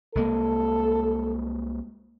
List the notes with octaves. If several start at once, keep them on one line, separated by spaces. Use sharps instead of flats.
C2 G#3 A#3 A4